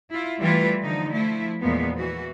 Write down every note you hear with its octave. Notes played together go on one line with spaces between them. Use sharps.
E4 F4
E3 G3 A3 E4 F4 B4
D3 F3 D#4
F3 A3 E4
E2 A#2 F3 G#3 B3
E3 F#4